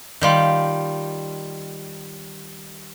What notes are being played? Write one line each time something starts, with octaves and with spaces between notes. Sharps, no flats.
D#3 G3 F4